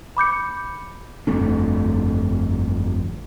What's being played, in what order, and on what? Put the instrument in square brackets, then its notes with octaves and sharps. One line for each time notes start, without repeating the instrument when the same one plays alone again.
[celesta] B5 D6 G6 C#7
[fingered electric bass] G1 F2 A3 D4